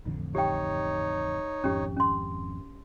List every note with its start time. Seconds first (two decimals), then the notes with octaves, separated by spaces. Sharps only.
0.05 A1 F2 D3
0.35 D#4 G4 C#5 G5
1.64 G#1 F2 C#4 G4
1.96 C#4 C6